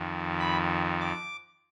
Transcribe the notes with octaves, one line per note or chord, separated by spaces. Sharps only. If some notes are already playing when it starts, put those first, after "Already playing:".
Already playing: F2 D#3
B5
D6